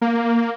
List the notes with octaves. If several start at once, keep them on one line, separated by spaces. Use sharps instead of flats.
A#3